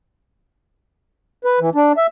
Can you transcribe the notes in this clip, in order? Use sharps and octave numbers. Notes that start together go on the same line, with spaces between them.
B4
E3
D4
E5